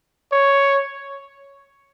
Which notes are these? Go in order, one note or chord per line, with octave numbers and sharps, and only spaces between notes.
C#5